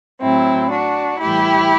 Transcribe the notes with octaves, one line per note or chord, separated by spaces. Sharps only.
A2 F#3 C4 E4
D4 F#4
A2 E3 G3 E4 G4